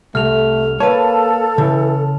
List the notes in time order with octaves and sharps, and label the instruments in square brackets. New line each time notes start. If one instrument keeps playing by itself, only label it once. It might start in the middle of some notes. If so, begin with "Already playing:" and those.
[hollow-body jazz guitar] C2 [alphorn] A3 [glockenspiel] F6 F7
[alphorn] A#3 [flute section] A4 [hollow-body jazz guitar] B4 C#5 [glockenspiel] A5
[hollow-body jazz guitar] C#3 [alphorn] E3